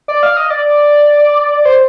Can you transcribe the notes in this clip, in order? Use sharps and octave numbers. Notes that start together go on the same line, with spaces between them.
D5
F5
D#5
D5
C5